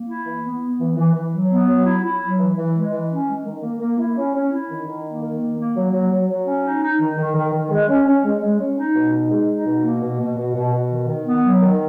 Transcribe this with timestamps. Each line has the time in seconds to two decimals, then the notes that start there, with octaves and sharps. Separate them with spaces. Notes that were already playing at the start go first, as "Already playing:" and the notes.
Already playing: A#3
0.08 E4
0.26 E3
0.44 B3
0.62 B3
0.80 E3
0.97 E3
1.14 E3
1.33 F#3
1.50 B3
1.68 F#3
1.85 E4
2.04 E4
2.22 F#3
2.39 E3
2.57 E3
2.75 G#3
2.92 E3
3.10 C#4
3.28 G#3
3.46 D#3
3.63 A#3
3.81 A#3
3.98 E4
4.17 C#4
4.34 C#4
4.52 E4
4.70 D#3
4.88 D#3
5.05 A#3
5.23 D#3
5.40 A#3
5.58 A#3
5.76 F#3
5.93 F#3
6.11 F#3
6.29 F#3
6.47 C#4
6.64 D#4
6.82 D#4
7.01 D#3
7.18 D#3
7.35 D#3
7.53 D#3
7.71 G#3
7.89 C#4
8.07 C#4
8.25 G#3
8.42 G#3
8.60 C#4
8.78 D#4
8.96 B2
9.13 D#4
9.31 G#3
9.48 D#4
9.67 B2
9.84 A#3
10.02 B2
10.20 B2
10.38 B2
10.55 B2
10.73 B2
10.91 D#3
11.08 D#3
11.26 B3
11.43 F#3
11.61 D#3